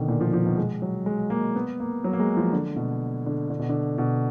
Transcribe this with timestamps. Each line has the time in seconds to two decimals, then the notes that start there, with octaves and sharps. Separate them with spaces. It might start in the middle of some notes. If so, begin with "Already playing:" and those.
Already playing: B2 D3 D#3
0.08 A#2
0.21 F3
0.33 F3
0.45 B2
0.57 G#3
0.82 F#3
1.06 G#3
1.30 A#3
1.56 B3
1.80 A#3
2.04 F#3
2.13 A#3
2.20 G#3
2.37 F3
2.53 D3
2.76 B2
3.26 D3
3.50 D3
3.59 B2
3.69 D3
3.98 B2